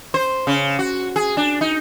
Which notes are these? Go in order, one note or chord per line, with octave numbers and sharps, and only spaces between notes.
C5
C#3
F#4
G#4
D4
D#4